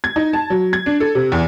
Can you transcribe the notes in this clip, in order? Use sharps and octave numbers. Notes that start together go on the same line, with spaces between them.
G#6
D#4
A5
F#3
G#6
D4
A4
C3
E2